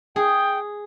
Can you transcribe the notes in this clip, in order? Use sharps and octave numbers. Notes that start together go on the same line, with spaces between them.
G#4 G5